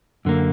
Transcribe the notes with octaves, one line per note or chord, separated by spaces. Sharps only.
F#2 D3 A#3